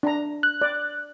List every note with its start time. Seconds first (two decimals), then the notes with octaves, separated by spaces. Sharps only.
0.03 D4 A#5
0.43 F#6
0.61 D5